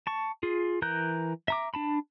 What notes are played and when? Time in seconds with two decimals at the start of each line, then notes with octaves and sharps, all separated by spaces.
0.07 A5 C#6
0.43 F4 G#4
0.82 E3 A#4 A#5 F#6 G6
1.48 E5 A#5 D6
1.74 D4 A5 B5